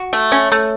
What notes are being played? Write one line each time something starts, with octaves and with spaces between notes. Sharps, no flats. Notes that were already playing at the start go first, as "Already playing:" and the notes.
Already playing: F#4
A3
C#4
A3